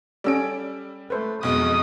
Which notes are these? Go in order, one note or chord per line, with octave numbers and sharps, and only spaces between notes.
G3 C#4 A4 D5 E6 D7
A3 B4 C5
B1 F2 B2 G#3 D#6